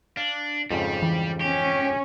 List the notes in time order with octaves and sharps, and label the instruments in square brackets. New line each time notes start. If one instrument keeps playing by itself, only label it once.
[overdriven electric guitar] D4 [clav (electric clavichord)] F5
[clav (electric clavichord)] F2 G#2 C#3 [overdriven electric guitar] G3
[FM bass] E3
[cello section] C#4 [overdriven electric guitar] G4